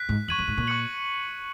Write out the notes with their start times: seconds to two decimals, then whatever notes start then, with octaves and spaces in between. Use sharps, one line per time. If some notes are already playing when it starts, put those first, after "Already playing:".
Already playing: F#6 B6
0.09 G#2
0.28 E2 C#6 G#6 D#7 F#7
0.39 F#2
0.48 G#2
0.57 A#2
0.67 C#6 F#6 C#7 F#7